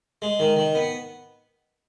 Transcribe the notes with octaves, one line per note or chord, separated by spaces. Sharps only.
G#3
D#3
D#3
B3